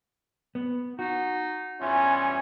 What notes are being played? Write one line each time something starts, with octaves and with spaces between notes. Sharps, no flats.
B3
D#4 F#4
E2 G2 C#4 F4 E5 G#5